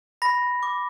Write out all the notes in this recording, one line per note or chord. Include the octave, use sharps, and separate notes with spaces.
B5 A#6
D6